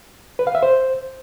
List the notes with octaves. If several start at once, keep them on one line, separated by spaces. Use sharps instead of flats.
B4
F5
E5
C5